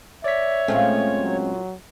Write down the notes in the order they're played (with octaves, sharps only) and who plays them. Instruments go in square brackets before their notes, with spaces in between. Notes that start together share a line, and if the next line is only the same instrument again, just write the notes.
[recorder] C#5 [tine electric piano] D5 B6 [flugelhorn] E5
[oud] A#2 F3 A3 [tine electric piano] G#3 C4 C#4
[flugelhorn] F#3